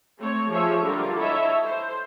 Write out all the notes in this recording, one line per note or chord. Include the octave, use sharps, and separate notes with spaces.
A3 C4 C#5
F3 G4 G#4 C#5 E5
D3 G3 F4 A#4
E4 A4 C#5 D#5 E5
C5